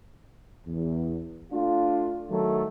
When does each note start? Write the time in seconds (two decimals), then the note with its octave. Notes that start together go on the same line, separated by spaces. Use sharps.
0.66 E2
1.53 A3 D4 F4
2.30 D#3 F#3 A3 A4